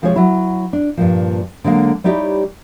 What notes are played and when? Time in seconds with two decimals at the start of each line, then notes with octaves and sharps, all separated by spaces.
0.02 C3 F3 G#3 F4 G#4 C#5
0.16 F#3 E4
0.73 D4
0.97 G2 A#2 F3
1.64 D3 F#3 G#3 A#3
2.04 G3 D#4 E4 G4 C#5 D#5